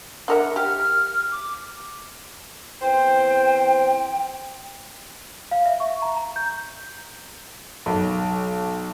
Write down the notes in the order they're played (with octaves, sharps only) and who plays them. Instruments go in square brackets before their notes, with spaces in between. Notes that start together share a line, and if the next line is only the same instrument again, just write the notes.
[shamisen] D4 A#4 E5 [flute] F#5
[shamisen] G4 [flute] F6
[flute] D6
[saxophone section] E2 C4 C5 [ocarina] G5
[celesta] F5
E5
C#6
A#5
A#5
G6
[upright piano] B1